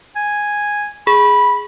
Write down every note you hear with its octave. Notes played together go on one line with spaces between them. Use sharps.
G#5
G#4 B5